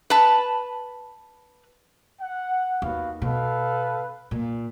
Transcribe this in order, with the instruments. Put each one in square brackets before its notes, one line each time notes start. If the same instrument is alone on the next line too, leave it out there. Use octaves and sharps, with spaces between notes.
[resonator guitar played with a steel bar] B4 A5
[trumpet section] F#5
[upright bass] D#2 [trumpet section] B3 F#4 F5
[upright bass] B2 [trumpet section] A4 B4 F5
[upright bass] A#2